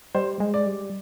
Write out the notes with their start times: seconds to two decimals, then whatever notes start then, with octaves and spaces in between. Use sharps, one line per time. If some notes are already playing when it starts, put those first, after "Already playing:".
0.15 G3 C5
0.40 G#3
0.54 D5
0.66 G3